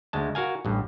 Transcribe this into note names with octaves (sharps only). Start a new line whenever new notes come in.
D2 G#3 A5
F#4 A#4 F5 G#5
A1 G2